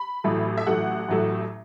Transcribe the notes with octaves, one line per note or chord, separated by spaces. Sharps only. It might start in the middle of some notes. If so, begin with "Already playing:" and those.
Already playing: B5
A1 A2 F#3 A3
E5
A1 A2 F#3 A3 F#5
A1 A2 F#3 A3